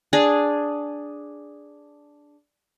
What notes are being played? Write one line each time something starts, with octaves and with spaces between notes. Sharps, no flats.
D4 G#4